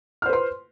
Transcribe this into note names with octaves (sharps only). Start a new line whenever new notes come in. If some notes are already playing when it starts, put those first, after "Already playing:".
B4 C5 C6 F6